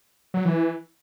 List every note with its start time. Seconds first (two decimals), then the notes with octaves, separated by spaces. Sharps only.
0.34 F#3
0.45 E3